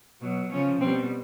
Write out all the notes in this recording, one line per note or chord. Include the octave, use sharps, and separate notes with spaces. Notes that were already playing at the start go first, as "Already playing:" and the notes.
B2 F#3
C#3 F3 C#4
B2 G3 C4